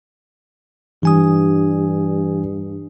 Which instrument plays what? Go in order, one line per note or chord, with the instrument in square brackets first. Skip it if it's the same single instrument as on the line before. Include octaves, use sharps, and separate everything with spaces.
[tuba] G2 [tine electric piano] E3 G#5 D#6